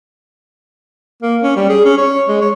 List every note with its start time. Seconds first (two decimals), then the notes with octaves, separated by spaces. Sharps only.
1.22 A#3
1.43 C#4
1.56 G3
1.69 G#4
1.85 C#4
1.98 C#5
2.28 G#3
2.41 C#5